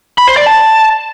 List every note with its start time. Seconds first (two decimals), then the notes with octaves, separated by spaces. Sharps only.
0.18 B5
0.28 C5
0.37 D5
0.46 A5